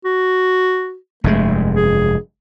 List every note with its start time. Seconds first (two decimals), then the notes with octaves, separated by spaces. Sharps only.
0.05 F#4
1.24 F1 G2 G#3 A3
1.76 G#4